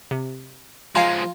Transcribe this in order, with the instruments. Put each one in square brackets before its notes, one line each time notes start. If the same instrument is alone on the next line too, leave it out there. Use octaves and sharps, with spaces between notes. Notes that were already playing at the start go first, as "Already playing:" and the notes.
[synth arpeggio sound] C3
[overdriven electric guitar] F3 G#3 [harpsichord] F4 [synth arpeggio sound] F5 G#5 A#5